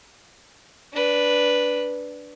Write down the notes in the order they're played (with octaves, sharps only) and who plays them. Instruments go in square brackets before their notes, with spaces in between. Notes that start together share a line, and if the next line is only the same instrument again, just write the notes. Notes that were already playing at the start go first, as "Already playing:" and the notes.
[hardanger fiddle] D4 B4